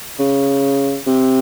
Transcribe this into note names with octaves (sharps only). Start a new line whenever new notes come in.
C#3
C3